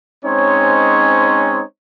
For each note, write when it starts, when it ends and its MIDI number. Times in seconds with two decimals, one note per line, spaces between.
0.25 1.64 56
0.25 1.64 60
0.25 1.64 61
0.25 1.64 63
0.25 1.64 72
0.25 1.64 73